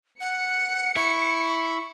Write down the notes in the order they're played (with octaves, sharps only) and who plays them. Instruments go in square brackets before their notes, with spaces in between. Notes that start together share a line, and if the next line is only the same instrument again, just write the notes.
[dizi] F#5 [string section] C#7
[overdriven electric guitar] E4 [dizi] C#6